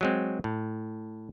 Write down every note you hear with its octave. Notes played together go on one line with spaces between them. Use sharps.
F#3 G#3 C4
A2